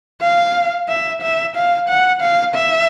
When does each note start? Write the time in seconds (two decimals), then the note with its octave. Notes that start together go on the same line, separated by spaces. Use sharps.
0.22 F5
0.89 E5
1.22 E5
1.56 F5
1.88 F#5
2.21 F5
2.55 E5